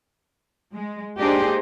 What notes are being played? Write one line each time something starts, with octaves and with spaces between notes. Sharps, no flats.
G#3
A#3 D4 D#4 G4 G#4 C5